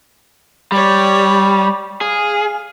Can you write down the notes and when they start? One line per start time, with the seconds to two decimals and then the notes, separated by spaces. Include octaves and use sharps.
0.72 G3 C#5 D5
2.01 G#4 F5